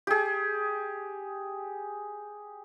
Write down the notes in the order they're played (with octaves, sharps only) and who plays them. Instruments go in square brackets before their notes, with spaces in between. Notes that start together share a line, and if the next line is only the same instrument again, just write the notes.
[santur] G4 G#4